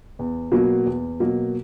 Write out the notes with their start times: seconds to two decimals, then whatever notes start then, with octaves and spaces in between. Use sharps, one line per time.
0.19 E2
0.52 B2 F#3 A#3
0.86 E2
1.20 B2 F#3 A#3